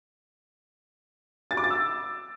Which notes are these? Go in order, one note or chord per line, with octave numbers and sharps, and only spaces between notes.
A6
D6
A6
E6